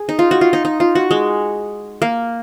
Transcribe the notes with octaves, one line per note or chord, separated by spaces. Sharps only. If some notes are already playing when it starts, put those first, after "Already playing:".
Already playing: G#4
D#4
F4
F#4
F4
D#4
D#4
F4
F#4
G#3
A#3